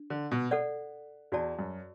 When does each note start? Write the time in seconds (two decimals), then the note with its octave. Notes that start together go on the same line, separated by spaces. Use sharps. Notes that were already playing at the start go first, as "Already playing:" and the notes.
Already playing: D4
0.10 D3
0.31 B2
0.51 A4 D5 F#5
1.32 E2 F#4 D5 A5
1.59 F#2